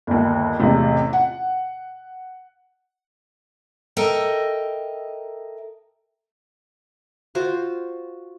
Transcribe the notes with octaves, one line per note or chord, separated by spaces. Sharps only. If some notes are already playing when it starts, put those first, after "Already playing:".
G1 D#2
A1 E2 C3
F#5
A4 A#4 D#5 E5 G5
F4 F#4 C5